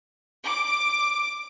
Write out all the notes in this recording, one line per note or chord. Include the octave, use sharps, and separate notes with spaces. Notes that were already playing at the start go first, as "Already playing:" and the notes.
D6